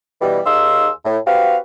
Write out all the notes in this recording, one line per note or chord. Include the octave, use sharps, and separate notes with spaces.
B2 E3 G3
D#2 D#4 G#4 F5 C6 E6
A2
C4 F#4 G4 B4 F5